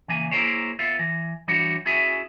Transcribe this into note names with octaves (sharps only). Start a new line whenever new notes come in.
C#3 E3 A#3 G#5
A#3 E4 G#4 A#4 C5 C#5
B3 F4 E5
E3
E3 G3 D4 F#4 C#5
C#4 E4 F#4 G#4 E5 G#5